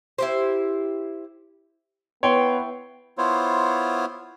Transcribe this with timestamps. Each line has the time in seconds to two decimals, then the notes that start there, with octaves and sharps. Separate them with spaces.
0.18 E4 G4 C5
2.23 B3 E4 C#5 G5 C6
3.18 B3 E4 F4 C5 C#5